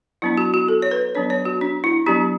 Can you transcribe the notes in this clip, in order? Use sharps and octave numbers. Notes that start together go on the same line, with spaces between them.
F#3 B3 D4 E4
F#4
F#4
A4
C#5
B4
F#3 B3 D4 C#5
C#5
F#4
D4
E4
F#3 B3 D4 G4